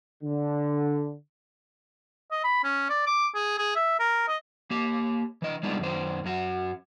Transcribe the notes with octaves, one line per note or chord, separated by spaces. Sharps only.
D3
D#5
B5
C#4
D5
D6
G#4
G#4
E5
A#4
D#5
A#3 G4
E3 D#5
G3 G#3 B3 D4 D#4 F4
F#2 D#3 C5
F#2 F#3 F#4